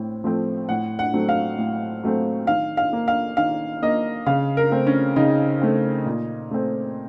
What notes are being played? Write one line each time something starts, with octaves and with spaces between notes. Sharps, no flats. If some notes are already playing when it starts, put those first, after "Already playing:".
Already playing: A2 C4
F3 A3 C4
A2 F#5
F#5
F#3 A3 C4
F5
A2
F#3 A3 C4
D#3 F5
F5
A#3
F5
D#3 F5
A#3 D#5
C#3 F5
A#4
A3 C4
C#4
C#3 D#4
A3 C4
A#2
A3 C4